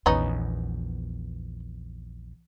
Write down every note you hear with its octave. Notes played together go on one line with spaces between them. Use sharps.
A#1 E2 B3 C#4 D#4